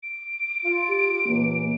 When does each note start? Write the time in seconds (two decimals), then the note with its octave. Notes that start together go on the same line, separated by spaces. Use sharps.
0.03 D7
0.64 F4
0.89 G4
1.27 C#2 A#2 E3 A#3